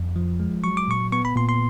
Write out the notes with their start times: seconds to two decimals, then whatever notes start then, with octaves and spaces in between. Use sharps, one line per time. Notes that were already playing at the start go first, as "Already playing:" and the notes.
Already playing: F2
0.16 F3
0.40 G#3
0.64 F#3 C#6
0.77 D6
0.88 A#2 C#6
1.12 B3 C#6
1.25 B5
1.36 A#2 C6
1.49 C6